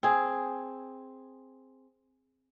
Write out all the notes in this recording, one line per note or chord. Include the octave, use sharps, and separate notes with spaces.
C4 G#4